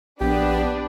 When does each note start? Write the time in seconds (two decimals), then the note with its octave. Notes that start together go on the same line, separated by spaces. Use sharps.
0.21 A#1 B3 D4 G4 B4